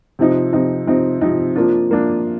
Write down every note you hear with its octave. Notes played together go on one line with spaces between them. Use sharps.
C3 F3 C4 D#4
C3 F3 C4 D#4
C3 F3 C4 D#4
C3 F3 C4 D#4
F3 A#3 D4 F4
F3 A#3 D4 F4